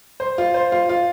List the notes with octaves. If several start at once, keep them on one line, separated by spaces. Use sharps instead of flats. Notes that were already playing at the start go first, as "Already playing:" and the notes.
C5
F4
C5
F4
F4